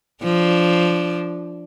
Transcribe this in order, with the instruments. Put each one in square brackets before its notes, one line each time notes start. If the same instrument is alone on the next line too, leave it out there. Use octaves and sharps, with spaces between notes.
[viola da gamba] F3 D4